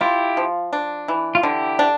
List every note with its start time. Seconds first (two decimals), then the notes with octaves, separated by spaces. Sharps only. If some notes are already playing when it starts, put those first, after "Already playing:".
0.01 E4 F4 G4
0.37 F3
0.73 D4
1.08 E3
1.35 F4
1.43 D3 E4 G4
1.79 D4